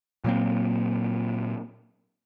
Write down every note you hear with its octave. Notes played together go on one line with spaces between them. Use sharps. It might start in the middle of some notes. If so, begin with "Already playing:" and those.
A#2 F#3 A#3 C4